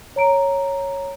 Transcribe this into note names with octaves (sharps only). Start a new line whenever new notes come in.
C#5 A#5 D7